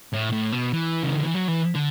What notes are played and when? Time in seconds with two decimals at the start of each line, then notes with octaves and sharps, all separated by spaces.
0.13 A2
0.32 A2
0.52 B2
0.73 E3
1.03 C#3
1.13 D3
1.23 E3
1.35 F#3
1.48 E3
1.75 D3